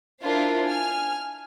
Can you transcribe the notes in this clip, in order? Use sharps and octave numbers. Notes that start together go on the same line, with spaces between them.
D4 E4 F4 A#4 C5
G#5 F6